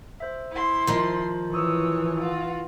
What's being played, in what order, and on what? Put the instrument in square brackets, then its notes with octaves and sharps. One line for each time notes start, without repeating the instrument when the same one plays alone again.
[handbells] C5 E5
[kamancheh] E4 C6
[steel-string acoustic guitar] D#3 F3
[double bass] E3 [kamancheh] C#5 [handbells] C#6 D#6 E6
[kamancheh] F4 F#4